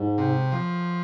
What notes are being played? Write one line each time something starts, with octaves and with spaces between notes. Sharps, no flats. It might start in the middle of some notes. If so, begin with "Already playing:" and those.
Already playing: G#2
C3
F3